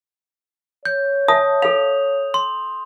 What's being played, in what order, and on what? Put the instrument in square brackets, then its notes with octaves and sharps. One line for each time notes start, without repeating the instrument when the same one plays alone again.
[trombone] C#5 [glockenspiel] G6
[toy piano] E5 A5 [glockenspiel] D#6
[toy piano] A4 F5 [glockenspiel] F7
[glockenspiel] C6